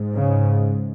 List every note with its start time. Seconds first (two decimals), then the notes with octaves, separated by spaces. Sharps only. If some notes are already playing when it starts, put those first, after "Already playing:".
Already playing: G#2
0.15 C#3